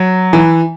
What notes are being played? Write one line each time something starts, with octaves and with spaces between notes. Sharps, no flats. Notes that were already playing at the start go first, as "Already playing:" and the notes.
Already playing: F#3
E3